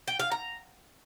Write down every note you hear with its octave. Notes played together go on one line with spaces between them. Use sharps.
G5
F5
A#5